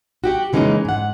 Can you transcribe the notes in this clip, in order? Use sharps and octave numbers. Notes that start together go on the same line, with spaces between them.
F#4 G4 F#5
C#3 E3 G#3 A#3 C#4 D#4
G#2 F#5